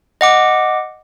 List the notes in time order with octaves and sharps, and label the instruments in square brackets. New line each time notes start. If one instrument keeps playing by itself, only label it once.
[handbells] D#5 F#5 D6